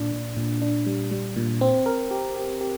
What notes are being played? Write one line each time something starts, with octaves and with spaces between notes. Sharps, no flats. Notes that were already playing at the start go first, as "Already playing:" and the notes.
Already playing: A#2 D4
A#2
A#2
D4
G3
G3
A#2
C4
A#4
G4
G4
G4